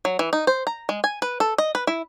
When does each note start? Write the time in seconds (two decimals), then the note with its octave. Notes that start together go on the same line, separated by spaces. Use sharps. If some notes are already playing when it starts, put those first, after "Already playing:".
0.05 F#3
0.19 E3
0.33 D#4
0.47 C5
0.67 A#5
0.89 G#3
1.04 G#5
1.22 B4
1.40 A4
1.58 D#5
1.75 B4
1.87 E4